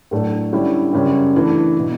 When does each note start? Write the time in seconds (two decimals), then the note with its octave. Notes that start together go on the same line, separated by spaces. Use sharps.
0.11 A2 F#3 A3 D4 A4
0.52 D3 G3 C#4 E4
0.93 F#2 C#3 G3 C#4
1.34 G2 E3 A3
1.79 B2